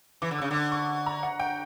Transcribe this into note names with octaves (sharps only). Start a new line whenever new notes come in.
E3 D6
D3
C#3 E6
D3 D6
C#6
A#5
F#5
G5